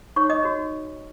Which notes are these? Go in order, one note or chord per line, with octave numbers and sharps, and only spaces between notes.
D#4 C#5 C#6
D#5 D#6
F#4 C#5